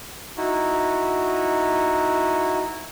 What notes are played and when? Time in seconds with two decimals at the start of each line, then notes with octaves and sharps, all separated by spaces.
0.37 D#4 E4 F#4